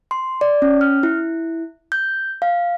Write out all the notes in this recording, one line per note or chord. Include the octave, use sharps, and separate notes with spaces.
C6
D5
C#4
F6
E4
G6
F5